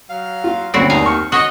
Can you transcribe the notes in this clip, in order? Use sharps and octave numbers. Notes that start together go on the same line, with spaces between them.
F#3 F5
F4
D2 G2 C4 C#4 E4 F#4 D5
D#2 F5 G#5 A#5
C#6 F6
F#4 C#5 D#5 D#6